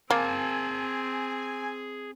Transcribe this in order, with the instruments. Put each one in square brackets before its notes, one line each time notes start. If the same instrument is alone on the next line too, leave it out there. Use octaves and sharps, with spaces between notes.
[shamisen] A#3 [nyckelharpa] C4 [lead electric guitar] G#4 A5 [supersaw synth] G#5